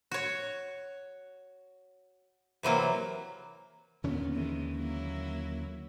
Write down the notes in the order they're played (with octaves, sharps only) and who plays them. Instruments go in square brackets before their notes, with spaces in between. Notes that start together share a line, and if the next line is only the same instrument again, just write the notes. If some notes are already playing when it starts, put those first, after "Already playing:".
[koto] F#4 C#5
C3 E3 F#3 A#3
[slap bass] D#2 D3 C#4 [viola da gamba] A#2 B3
[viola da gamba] D#3 E3 G#3
F#3 A#3 E4